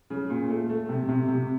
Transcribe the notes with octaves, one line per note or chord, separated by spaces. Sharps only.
C#3
A#2
A3
A3
C3
C3
C3